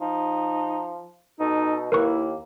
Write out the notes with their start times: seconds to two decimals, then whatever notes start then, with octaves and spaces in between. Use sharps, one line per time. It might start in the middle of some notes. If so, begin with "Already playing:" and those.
0.01 F3 D#4
1.40 B2 D#4 A4
1.92 D#2 A#3 E4 A#4 B4 C#6